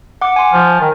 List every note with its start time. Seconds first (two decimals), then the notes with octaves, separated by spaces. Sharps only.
0.21 F#5 D6
0.36 G#5 C6
0.54 F3
0.81 D#3